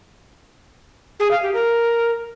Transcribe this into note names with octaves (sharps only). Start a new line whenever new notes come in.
G#4
F5
G4
A#4